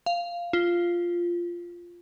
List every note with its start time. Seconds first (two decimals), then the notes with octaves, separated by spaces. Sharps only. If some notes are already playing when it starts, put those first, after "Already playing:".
0.06 F5
0.53 F4